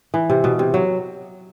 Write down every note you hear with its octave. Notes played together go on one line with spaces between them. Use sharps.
E3
C3
B2
C3
F#3